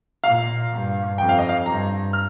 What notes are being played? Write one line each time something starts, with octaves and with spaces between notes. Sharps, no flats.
A#2 F5
G2
F2 G5
F5
D#5
F5
G2 A#5
F6